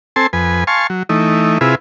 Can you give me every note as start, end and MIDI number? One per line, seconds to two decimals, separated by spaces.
0.16 0.27 60
0.16 0.27 69
0.16 0.27 80
0.16 0.27 81
0.16 0.27 84
0.33 0.64 41
0.33 0.64 71
0.33 0.64 80
0.67 0.87 77
0.67 0.87 80
0.67 0.87 81
0.67 0.87 84
0.67 0.87 85
0.90 1.03 54
1.09 1.58 52
1.09 1.58 57
1.09 1.58 63
1.61 1.75 48
1.61 1.75 64
1.61 1.75 65
1.61 1.75 68
1.61 1.75 71